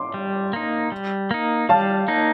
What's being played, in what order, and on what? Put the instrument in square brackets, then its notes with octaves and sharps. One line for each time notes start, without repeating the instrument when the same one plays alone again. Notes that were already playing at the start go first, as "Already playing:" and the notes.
Already playing: [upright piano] C6 D6
[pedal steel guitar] G3
A#3 D#4
G3
A#3 D#4
[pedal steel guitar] G3 [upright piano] F5 A5
[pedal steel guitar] A#3 D#4